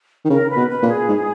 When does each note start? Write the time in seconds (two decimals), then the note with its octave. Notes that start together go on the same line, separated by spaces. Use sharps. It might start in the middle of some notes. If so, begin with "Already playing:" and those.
0.25 D#3
0.30 C#3 A#4
0.50 B4
0.56 B2
0.69 B4
0.83 A#2
0.88 G#4
1.08 G#2